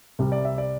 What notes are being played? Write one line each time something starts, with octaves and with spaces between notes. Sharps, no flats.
C2 C3 G3
D5
E5
D5